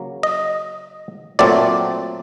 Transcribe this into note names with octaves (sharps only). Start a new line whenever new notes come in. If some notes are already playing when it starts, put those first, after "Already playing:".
Already playing: C#3 F#3 A#3
D#5
A#2 F#3 A3 C4 D5